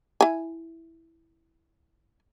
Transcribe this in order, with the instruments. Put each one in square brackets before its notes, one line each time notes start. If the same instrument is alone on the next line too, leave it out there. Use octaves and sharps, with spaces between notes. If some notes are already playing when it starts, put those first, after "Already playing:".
[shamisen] E4 G#5